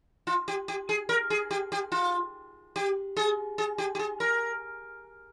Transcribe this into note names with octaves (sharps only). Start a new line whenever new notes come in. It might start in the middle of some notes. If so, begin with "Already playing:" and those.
F4
G4
G4
G#4
A#4
G#4
G4
G4
F4
G4
G#4
G#4
G4
G4
G#4
A#4